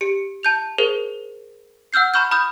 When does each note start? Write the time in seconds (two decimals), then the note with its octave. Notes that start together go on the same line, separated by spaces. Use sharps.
0.01 G4 C#7
0.43 A5 G6 F7
0.78 G#4 A#4 C5
1.93 F#5 E6 F6 G6 C7
2.14 A#5 B5 C#6 F6 G6
2.31 B5 D#6 F6 G6